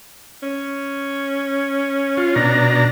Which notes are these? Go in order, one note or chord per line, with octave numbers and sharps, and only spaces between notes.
C#4
F4
B2 D4 A#5